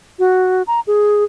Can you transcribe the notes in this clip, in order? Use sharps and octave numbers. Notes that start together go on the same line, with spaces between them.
F#4
A#5
G#4